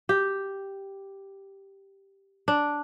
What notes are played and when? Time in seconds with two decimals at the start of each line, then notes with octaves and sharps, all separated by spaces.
0.09 G4
2.48 D4